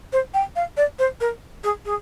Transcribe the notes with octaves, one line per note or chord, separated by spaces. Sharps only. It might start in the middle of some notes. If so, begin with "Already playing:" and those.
C5
G5
F5
D5
C5
A#4
G#4
G#4